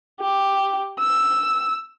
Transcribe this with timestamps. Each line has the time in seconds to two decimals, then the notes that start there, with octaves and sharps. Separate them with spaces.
0.21 G4
1.00 E6